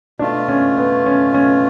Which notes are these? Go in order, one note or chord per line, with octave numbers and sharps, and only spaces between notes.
B2 A3 D4 F4
C#4
B3
C#4
C#4